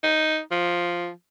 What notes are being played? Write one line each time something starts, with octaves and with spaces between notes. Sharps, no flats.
D#4
F3